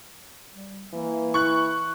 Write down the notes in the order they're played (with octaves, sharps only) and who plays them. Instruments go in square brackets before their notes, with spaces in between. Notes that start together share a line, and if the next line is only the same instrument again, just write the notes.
[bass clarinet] G3
[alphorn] E3 [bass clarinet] A#3
[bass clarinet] E4 [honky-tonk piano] C#6 F#6